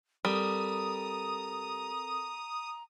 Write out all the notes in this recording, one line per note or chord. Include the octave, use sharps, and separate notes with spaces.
G3 C4 A4 A#4 A#5 D#6